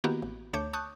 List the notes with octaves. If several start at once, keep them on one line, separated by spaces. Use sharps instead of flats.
D#3 A#3 B3 E4 F#4 G4
A1
D2 A3 C#5 D6 G6
A5 C#6 D#6 F#6 G6